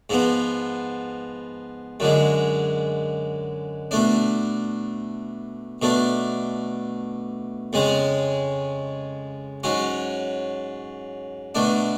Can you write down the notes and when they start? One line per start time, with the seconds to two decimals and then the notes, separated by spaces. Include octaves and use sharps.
0.10 G#2 F3 B3
2.00 F#2 D3 G#3
3.91 B2 A3 D4
5.82 B2 A3 D4
7.73 F2 C#3 G#3 C#4
9.64 G#2 F#3 C#4
11.55 B2 A3 D4